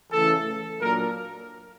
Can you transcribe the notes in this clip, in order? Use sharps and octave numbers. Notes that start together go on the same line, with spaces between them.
C#3 E3 A3 C#4 E4 A4
A#2 F#3 A#3 D4 A#4